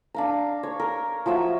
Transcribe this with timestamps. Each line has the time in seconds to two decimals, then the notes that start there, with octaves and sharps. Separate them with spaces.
0.14 D4 F5 A#5
0.63 C#5
0.80 A#4
1.26 F3 F#3 E5 E6